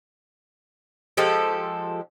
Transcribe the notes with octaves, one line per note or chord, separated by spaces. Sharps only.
F3 G#3 G4 A4